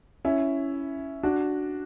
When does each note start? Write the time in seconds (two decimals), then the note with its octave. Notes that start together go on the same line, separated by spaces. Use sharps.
0.25 C#4 E4
1.23 D4 F#4